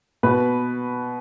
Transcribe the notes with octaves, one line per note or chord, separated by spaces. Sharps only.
B2 B4